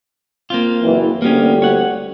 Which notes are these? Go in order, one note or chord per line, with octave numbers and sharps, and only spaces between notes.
A#3 C4 F4
F#1 E3
G1 D2 A#3 B3 C#4 G4
C#5 F#5